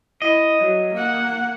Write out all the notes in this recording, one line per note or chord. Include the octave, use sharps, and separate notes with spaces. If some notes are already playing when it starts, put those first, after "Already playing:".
E4 D#5
F#3
A#3 F#5